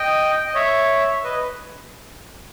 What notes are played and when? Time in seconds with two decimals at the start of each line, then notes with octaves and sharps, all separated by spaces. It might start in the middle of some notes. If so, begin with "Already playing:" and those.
Already playing: D#5 G5
0.46 D#5
0.54 C#5 E5
1.24 B4 D#5